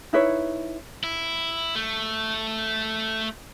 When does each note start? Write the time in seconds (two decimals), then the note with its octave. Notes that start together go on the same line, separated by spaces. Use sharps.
0.13 D#4 E4 B4 C#5
1.04 E4
1.75 A3